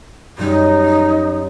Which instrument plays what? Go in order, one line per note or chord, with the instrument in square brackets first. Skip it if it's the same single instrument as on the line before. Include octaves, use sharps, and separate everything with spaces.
[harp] F#2 G3 [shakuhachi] D#4